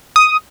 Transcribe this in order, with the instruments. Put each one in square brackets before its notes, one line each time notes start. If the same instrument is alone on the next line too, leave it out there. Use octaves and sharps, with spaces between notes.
[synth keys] D#6